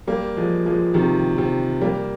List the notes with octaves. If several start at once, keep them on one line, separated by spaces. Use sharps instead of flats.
G3 A#3
F3 G#3
F3 G#3
C3 D#3
C3
G3 A#3